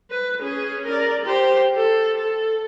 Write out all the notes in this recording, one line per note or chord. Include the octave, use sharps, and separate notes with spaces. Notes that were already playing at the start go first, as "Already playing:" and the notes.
B4
C#4 G#4
A#4 D5
G4 C5
A4
A4